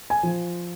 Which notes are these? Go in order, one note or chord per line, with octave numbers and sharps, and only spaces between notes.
G#5
F3